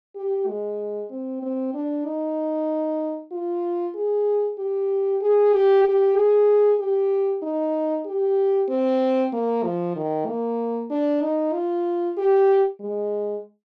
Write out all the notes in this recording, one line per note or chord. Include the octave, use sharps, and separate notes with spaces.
G4
G#3
C4
C4
D4
D#4
F4
G#4
G4
G#4
G4
G4
G#4
G4
D#4
G4
C4
A#3
F3
D#3
A#3
D4
D#4
F4
G4
G#3